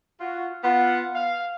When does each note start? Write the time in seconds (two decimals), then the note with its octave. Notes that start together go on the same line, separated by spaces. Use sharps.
0.21 F4 F#4
0.64 B3 F4 F#5
1.14 F5